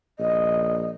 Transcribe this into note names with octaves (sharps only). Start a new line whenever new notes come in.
A#1 D#5